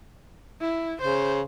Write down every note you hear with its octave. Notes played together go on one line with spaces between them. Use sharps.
E4
C#3 C5